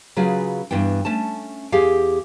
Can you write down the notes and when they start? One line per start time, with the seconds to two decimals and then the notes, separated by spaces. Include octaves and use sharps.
0.17 C#3 F#3 F4 G#4 B4
0.71 G2 E3 B3 G5
1.05 A3 C#4 A5
1.72 E2 G4 G#4 F5